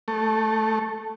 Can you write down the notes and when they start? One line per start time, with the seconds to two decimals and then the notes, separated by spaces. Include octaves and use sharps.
0.08 A3